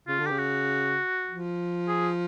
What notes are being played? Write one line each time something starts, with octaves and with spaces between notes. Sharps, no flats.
C#3 F4
D3
C#3 G4
F#4
F3
G#4